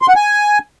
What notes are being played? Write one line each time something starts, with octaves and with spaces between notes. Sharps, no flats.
C6
F#5
G#5